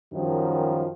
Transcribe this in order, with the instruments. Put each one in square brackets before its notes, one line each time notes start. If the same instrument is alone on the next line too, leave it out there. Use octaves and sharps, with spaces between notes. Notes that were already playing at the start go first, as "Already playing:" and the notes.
[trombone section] F#2 D#3 F3 G3